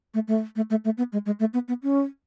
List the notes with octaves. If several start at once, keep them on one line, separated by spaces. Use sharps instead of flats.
A3
A3
A3
A3
A3
B3
G#3
G#3
A3
B3
B3
C#4